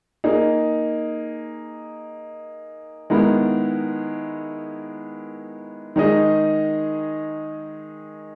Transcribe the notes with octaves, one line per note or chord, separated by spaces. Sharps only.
A#3 D#4 G#4
D#3 G#3 B3 E4 A#4
D#3 G#3 D#4 G#4 D#5